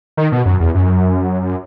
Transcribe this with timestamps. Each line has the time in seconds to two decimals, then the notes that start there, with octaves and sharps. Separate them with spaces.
0.17 D#3
0.32 B2
0.46 F#2
0.60 E2
0.74 F#2